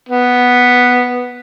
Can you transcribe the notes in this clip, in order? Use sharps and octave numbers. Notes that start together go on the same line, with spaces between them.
B3